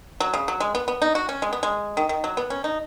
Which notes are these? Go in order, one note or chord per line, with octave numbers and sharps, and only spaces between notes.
F#3
C#3
F#3
G#3
B3
B3
D#4
F#4
C#4
G#3
B3
G#3
D#3
D#3
F#3
B3
C#4
D#4